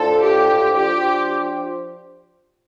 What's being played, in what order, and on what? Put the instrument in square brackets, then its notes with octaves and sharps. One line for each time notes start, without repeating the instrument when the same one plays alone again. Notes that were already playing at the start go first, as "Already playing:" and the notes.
Already playing: [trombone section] A2 A3 D4 F4 C5 [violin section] A4
[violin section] G4
[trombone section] F3 D4 F4 C5 [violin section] G4